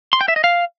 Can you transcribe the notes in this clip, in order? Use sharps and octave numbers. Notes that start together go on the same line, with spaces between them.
C6
G5
E5
D#5
F5